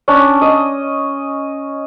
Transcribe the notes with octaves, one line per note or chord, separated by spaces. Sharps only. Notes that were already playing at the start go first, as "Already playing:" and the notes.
C#4 D4
D#5